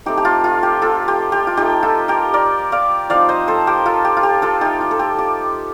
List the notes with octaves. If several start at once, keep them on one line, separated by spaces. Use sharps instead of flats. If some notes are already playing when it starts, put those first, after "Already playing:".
A3 C4 D#4 G4
G4
F4
F4
G4
F4 A4
G4
G4
F4
A3 D#4 G4
F4 A4
G4 A#4
A#4 D5
D5 F5
F3 C4 D#4 D5 F5
C5 D#5
A4 C5
G4 A#4
F4 A4
G4
F4
G4
F4 A4
A3 D#4 G4
F4
A4
G4
G4